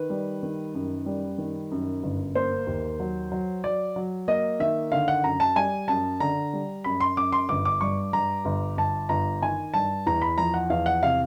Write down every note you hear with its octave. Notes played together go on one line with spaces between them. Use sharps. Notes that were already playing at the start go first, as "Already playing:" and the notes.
Already playing: D#3 B4
G3
D#3
F#2
G3
D#3
F#2
G1
A#3 C5
D#2
F#3
F#3
F#3 D5
F#3
A#3 D#5
D#3 E5
D3 F5
F#5
F#2 A#5
A5
G3 G#5
F#2 A5
D3 A#5
G3
F#2 B5
C6
F#2 D6
C6
G1 D6
D6
G2 C#6
G2 A#5
G1
G1 A5
G1 A#5
D#3 G#5
G2 A5
E2 A#5
B5
F3 A#5
F#5
E2 F5
F#5
C3 F5